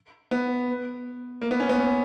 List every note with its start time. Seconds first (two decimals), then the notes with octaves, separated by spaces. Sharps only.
0.31 B3
1.41 A#3
1.51 B3
1.60 C#4
1.69 B3
1.79 C#4